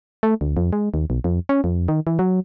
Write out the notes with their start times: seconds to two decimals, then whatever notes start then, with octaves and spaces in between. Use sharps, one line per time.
0.23 A3
0.41 D2
0.57 F2
0.73 G#3
0.94 D#2
1.10 B1
1.24 F2
1.49 C#4
1.64 F2
1.88 D#3
2.07 E3
2.19 F#3